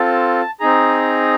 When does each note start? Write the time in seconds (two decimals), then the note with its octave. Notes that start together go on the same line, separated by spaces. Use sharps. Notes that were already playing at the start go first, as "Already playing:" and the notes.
Already playing: C4 F4 A4 A5
0.60 C4 D#4 G#4 A#5